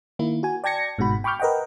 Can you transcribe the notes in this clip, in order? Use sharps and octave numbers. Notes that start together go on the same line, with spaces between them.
D#3 A#3 E4
F#4 G#5
D5 G5 A5 G#6 A#6 C#7
G1 G#2 B2 F#4 B5
G5 B5 C#6 D6 F6 G6
A#4 B4 D#5 F#5 G5